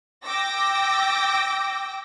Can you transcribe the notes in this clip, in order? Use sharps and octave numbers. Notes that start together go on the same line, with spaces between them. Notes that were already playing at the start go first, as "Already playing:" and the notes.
G5 D6 E6 A#6